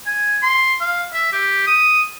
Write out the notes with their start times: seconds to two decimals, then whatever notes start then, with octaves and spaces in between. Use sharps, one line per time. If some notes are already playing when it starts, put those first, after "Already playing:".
0.06 G#5
0.43 C6
0.80 F5
1.13 E5
1.32 G4
1.67 D#6